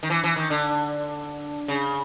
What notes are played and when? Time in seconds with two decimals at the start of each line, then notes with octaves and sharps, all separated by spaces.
0.03 D#3
0.10 E3
0.24 E3
0.36 D#3
0.50 D3
1.68 C#3